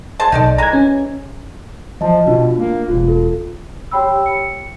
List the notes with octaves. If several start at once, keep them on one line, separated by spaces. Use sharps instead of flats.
G#4 C5 A5
B1 D#4 A4 D5
E3 G#3 A#5 G#6
C#4
F3 D#5 A5
B2 D4 F4
A#3
E1 F4
A4
G4 C#5 G5 B5 E6
C#7